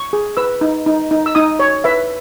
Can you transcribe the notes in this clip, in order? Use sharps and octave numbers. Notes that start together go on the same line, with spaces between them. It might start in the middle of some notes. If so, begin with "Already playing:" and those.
Already playing: C#6
G#4
B4 E6
D#4
D#4
D#4
E6
D#4 D#6
C#5
B4 E5